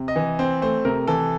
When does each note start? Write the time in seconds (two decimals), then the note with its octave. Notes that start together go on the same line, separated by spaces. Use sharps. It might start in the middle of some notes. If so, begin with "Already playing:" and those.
Already playing: C3
0.08 D#5
0.16 E3
0.39 C4 C5
0.62 A3 C5
0.85 C3 A#4
1.08 E3 A4